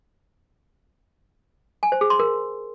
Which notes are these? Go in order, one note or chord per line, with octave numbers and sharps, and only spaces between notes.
G#5
C5
G#4
C6
A#4